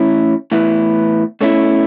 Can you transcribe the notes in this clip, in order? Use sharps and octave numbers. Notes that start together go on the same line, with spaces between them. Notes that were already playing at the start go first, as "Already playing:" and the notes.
Already playing: A2 E3 C#4 E4
A2 E3 B3 E4
B2 A3 C#4 E4